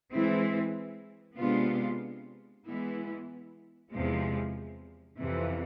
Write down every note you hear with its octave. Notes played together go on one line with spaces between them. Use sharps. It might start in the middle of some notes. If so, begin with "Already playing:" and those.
E3 G#3 C4 E4
C3 G#3 B3 D4 F4
E3 G#3 B3 E4
E2 C3 F3 G#3
F2 C3 E3